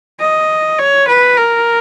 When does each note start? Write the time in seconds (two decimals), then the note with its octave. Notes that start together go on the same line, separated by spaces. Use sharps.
0.20 D#5
0.79 C#5
1.08 B4
1.37 A#4